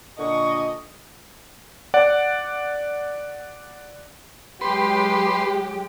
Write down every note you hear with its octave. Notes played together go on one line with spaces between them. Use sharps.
A#2 D3 D#5 C#6
D5 F#5
F#3 G#3 G4 B4 C6